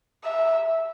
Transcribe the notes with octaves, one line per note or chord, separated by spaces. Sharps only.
E5